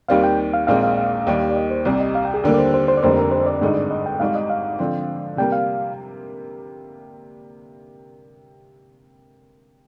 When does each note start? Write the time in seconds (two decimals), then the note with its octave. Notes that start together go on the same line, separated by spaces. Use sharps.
0.09 D#2 D#3 G3 C4 F5
0.24 G5
0.54 F5
0.67 A#1 A#2 G#3 C4 F5
0.83 F5
0.97 F5
1.27 D#2 D#3 G3
1.51 D5
1.56 D#5
1.70 C5
1.85 C2 C3 G3 D5
2.00 D#5
2.15 F5
2.25 G5
2.34 G#4
2.44 D#2 D3 G3 A#3 A#4
2.54 D5
2.58 C5
2.74 C5
2.88 C5
2.97 D5
3.03 F1 F2 D3 G3 A#3 C5
3.18 A#4
3.32 C5
3.46 D5
3.61 G#1 G2 D3 G#3 D#4
3.90 D#5
4.06 G5
4.20 G#1 G#2 G3 F5
4.35 D#5
4.50 F5
4.79 D3 F3 C4
5.37 C3 G3 A#3 G5
5.52 F5